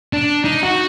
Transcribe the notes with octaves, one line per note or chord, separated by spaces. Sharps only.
D4
D#4
F#4